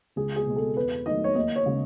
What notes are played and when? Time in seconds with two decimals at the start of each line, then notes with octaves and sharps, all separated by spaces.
0.16 C#2 G#4
0.36 G#4
0.46 B2 G#3
0.56 A4
0.76 E2 B4
1.06 D#3 F#3 A3 D#5
1.24 C#5
1.35 D#2 D#5
1.56 C#5
1.66 C#3 G#3 C#4